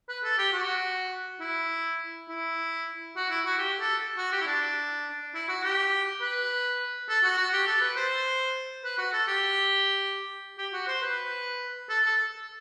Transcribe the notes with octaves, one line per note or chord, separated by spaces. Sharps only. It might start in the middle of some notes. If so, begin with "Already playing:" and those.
B4
A4
G4
F#4
E4
E4
F#4
E4
F#4
G4
A4
F#4
G4
E4
D4
E4
F#4
G4
B4
A4
F#4
F#4
G4
A4
B4
C5
B4
F#4
A4
G4
G4
F#4
C5
B4
A4
A4